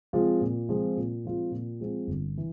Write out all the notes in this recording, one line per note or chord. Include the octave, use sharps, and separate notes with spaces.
F3 G#3 C4 F4
A#2
F3 G#3 C4 F4
A#2
F3 G#3 C4 F4
A#2
F3 G#3 C4 F4
G1
E3